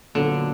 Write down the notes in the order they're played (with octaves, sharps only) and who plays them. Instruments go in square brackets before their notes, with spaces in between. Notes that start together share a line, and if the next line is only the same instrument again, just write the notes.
[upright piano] A#2 F#3 B3 D4 [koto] D3